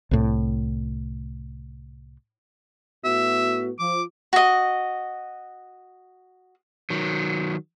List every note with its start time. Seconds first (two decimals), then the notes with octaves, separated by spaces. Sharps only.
0.11 C2 A2
3.04 A2 B3 F#4 E5
3.79 F3 D6
4.33 F#4 D#5
6.90 D#3 F#3